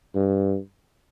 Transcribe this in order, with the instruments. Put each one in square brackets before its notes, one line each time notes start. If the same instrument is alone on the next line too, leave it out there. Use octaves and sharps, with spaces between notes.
[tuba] G2